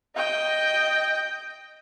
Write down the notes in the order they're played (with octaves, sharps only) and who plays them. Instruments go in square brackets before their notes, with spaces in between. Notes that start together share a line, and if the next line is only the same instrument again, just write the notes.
[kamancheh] D#5 G5